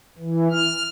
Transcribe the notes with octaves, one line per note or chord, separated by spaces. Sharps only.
E3
F6